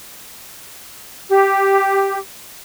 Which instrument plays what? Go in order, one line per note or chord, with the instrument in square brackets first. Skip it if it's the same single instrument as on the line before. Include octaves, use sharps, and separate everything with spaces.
[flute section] G4